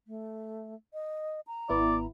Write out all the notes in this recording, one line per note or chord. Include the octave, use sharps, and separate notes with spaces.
A3
D#5
A#5
G#1 B3 E4 D5